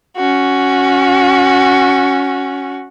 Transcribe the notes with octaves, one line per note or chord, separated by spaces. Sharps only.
C#4 F#4